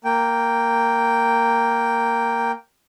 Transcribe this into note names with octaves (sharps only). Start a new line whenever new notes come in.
A#3 G5